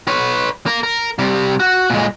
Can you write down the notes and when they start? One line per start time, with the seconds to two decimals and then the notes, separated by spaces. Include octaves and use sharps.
0.08 B4 C#5
0.66 A#3 A#4
0.83 A#4
1.19 C3 G3
1.60 F#4
1.90 A#2 G#3